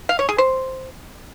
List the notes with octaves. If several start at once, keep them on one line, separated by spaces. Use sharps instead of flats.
F5
C#5
G#4
C5